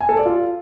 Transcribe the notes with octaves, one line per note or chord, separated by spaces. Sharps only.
G#5
A4
D5
F4